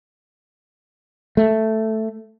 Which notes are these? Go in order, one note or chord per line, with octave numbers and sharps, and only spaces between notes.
A3